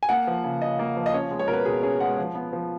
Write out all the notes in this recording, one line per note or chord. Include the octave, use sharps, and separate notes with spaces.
G#5
A#3 F#5
F3
C#3
C#3 D#5
A#3
F3
D#5
C#4 C#5
G#3
C#5
B2 A#4
B4
B2 G#4
C#4 G#4
G#3 F#5
F3
B3
F3